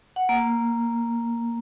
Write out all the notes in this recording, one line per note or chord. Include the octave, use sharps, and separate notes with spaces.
F#5
A#3